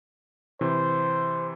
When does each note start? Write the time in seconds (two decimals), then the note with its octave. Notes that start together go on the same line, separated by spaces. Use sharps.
0.61 C3 E3 C5